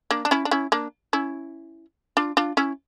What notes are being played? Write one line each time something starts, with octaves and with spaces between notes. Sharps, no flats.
A#3 D4
D4
C#4 E4
D4
C#4 E4
A#3 D4
C#4 E4
D4 F4
D4 F4
C#4 E4